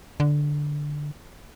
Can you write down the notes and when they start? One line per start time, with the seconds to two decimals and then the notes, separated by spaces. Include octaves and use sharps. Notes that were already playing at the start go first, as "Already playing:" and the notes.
0.20 D3